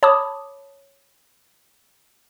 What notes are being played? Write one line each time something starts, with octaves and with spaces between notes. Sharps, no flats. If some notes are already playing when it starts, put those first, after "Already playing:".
C#5 A5 B5 D6 D#6